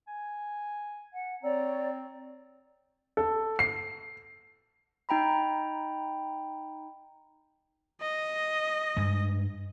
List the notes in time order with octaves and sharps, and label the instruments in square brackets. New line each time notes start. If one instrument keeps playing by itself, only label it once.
[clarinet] G#5
[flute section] F#5
[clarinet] C4 [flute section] C#5 D5 A#5
[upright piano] A4
C7
[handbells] D#4 G5 A#5 B5
[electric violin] D#5
[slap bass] G2 G#3